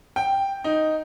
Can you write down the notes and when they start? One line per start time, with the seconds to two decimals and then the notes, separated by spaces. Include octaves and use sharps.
0.16 G5
0.64 D#4